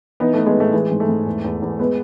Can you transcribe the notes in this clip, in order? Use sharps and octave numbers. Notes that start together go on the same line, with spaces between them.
E3 B3 D#4
E3 A3
G#3 B3
A2 A3
E3 G#3
G#2
A3
G#2
E2
E2
E2
G#3 B3